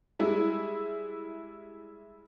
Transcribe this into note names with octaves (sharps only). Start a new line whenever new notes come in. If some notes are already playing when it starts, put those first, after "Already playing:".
G3 G#3 E4